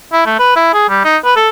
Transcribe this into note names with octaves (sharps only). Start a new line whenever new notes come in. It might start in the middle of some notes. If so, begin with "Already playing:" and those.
E4
A3
B4
E4
G#4
G3
D#4
B4
A4